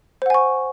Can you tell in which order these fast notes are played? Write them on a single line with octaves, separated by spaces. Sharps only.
C5 F#5 G#5 C#6